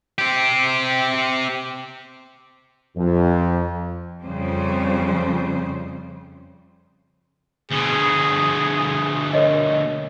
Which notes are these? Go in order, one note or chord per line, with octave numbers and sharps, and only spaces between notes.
C4 G4
F2
F2 C#3 G3 C5
D2 B2 G#4
A#4 C#5 D#5